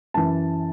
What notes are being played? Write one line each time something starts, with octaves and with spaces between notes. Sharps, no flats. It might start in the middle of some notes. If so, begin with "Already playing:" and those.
F#2 E3 A5